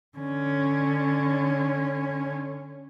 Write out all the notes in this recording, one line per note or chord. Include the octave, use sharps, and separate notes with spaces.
D3 C#4